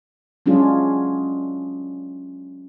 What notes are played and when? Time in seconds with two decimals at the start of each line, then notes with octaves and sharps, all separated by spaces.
0.46 F#3 G#3 C#4 D4 F4 G#4